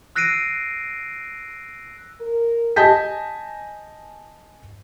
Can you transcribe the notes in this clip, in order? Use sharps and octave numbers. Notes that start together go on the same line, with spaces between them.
E6 F#6 A#6 C7 D7 D#7
A#4
D#5 G#5 A5 G6 B6